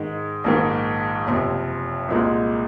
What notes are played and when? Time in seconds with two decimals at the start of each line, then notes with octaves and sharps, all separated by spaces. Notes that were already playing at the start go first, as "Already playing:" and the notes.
Already playing: G#2 D#3 G#3
0.44 A#1 G#2 D#3
1.26 F#1 F2 C3
2.08 C2 A#2 G#3